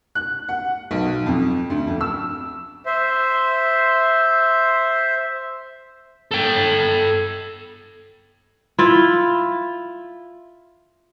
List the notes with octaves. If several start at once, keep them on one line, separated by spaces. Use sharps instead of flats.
F#6
F#5
B1
F2
D2
F2
E6
C5 E5
A4 G5
E4 F4